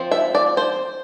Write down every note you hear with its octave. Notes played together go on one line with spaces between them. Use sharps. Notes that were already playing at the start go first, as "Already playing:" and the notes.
Already playing: F3 C4
E5
D5
C5